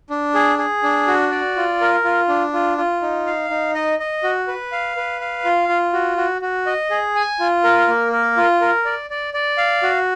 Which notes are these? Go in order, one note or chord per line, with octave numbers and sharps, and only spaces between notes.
D4
G#4
G#4
D4
F#4
D5
F4
A#4
F4
D4
F4
F4
D#4
F5
D#4
D#5
D#5
F#4
B4
F5
B4
F5
F4
F4
F#4
F#4
F#4
D#5
G#4
G#5
F4
A#4
A#3
A#4
F4
A#4
D5
D5
D5
F5
F#4